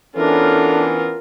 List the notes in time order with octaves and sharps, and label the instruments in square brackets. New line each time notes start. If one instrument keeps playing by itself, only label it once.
[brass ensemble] E3 B3 C#4 [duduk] D4 [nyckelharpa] F4 A#4 [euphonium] A4